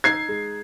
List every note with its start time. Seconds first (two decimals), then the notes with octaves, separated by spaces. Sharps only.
0.04 D#4 G#6 C7
0.29 G#3